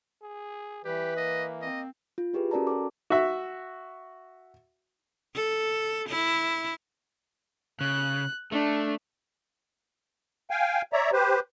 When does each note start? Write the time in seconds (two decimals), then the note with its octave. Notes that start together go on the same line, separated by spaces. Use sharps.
0.22 G#4
0.85 E3 G3 G4 B4
1.17 A#3 D#5
1.62 C4 D#5
2.18 F4
2.34 E4 G4 G#4 B4
2.51 C#4 F#4 A#4 D5 A5 A#5
2.67 F#4 A4 D6
3.10 F#4 E5
5.35 A4
6.10 E4
7.81 C#3 F#6
8.52 A3 D4
10.51 F5 G5 G#5
10.93 C#5 D5 E5 A#5
11.13 G4 B4 C5